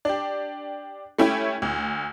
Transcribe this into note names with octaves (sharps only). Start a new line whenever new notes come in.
D4 G4
A3 C#4 E4 G4 G5
D2